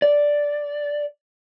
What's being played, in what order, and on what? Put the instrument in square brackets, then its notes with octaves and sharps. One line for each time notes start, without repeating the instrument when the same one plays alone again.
[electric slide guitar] D5